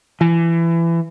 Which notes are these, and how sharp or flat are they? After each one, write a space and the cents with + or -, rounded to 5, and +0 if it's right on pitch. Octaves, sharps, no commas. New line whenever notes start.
E3 +25